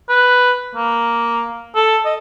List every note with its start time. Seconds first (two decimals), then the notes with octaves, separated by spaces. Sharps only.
0.10 B4
0.75 A#3
1.76 A4
2.05 D#5